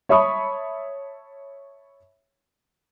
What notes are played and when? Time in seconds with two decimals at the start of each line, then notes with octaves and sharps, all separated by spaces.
0.09 C#5 E5 A5 B5 C#6 D#6